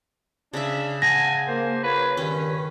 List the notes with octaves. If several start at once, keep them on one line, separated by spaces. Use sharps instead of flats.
C#3 D4 E5
F#5 G#5 A5 A#6
A#3 C5
F4 A#4 B4 C#5
G2 D#3 C#4 B4